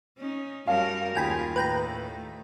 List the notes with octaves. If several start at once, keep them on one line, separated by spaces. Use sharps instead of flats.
C#4 D#4
F#2 G3 A#4 C#5 F5 A5
D#2 F4 G#4 A#4 G5 G#5 B5
A2 D#3 A3 B4 G5 A#5